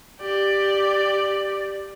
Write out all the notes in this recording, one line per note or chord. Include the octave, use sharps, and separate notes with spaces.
G4 D5